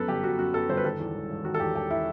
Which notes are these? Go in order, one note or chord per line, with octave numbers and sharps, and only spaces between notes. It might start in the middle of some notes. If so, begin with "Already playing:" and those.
Already playing: F#2 F#3 B3 A4 B4
G1 G4
F#3 F#4
F#2 F#4
B3 A4
G1 C5
B4
D#3 A4
E2
E1
E1
D#3 F#4
A4
E2 G4
E1 G4
E4